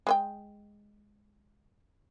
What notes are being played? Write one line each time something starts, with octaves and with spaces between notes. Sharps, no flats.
G#3 B4 G5